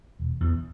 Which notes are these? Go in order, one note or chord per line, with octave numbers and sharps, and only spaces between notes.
E1
E2 E3